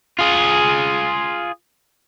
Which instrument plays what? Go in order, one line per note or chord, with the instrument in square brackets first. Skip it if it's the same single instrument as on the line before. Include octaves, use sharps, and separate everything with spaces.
[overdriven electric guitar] F4 G#4